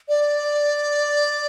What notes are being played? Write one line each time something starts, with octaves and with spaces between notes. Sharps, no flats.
D5